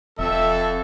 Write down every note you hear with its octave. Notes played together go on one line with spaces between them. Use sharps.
E1 F2 A4 E5